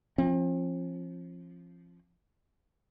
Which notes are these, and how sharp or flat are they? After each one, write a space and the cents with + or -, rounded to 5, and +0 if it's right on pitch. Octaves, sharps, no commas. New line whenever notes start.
F3 -15 C4 +40